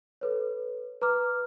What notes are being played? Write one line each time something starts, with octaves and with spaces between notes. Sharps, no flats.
A4 B4 C#5
B4 A#5 D6 F6